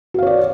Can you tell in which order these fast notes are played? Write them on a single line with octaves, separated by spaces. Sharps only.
F#4 F5 C#5 D5